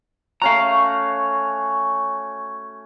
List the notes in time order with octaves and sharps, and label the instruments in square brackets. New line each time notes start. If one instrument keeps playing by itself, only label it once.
[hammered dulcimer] A3 C#4 F#4 [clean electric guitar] F5 A#5